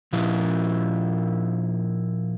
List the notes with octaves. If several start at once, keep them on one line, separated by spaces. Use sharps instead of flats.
A#2 F3 E4